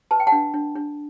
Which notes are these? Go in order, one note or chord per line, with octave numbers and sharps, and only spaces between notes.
B4 A5
G5
F#5 A5
D4
D4
D4